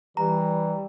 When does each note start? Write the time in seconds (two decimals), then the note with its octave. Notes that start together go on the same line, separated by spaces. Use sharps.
0.17 E3 G3 A#5